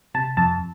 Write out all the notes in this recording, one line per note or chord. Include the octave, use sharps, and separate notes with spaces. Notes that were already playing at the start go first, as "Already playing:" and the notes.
C3 A5
F2 A5